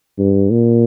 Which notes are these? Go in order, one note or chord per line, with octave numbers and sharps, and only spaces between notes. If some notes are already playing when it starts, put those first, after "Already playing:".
G2
A#2